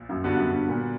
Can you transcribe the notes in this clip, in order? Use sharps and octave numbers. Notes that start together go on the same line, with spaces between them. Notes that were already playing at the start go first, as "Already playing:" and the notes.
Already playing: A#1 A#2
F#2
G2 D3 G3 B3 F#4
F#2
G2
A#2